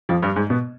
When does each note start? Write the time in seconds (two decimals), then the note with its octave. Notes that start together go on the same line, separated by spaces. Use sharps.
0.09 F2 F3
0.22 G2 G3
0.36 G#2 G#3
0.50 B2 B3